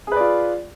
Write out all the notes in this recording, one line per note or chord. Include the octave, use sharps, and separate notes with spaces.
F4 G#4 B4 D5